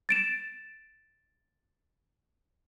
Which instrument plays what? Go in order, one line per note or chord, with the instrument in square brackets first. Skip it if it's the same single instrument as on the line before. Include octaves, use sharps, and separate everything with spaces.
[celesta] A6 D7 E7